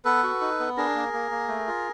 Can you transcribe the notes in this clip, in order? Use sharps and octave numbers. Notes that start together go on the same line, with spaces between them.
B3 A4 B4
F#4
D#4
B3
D4 G#4 A#4
A#3
A#3
A#3
A3
F4